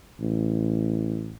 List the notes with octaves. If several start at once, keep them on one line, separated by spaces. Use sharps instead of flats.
A1